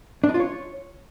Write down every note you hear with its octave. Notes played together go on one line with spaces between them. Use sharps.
D4
D#4
F4
C#5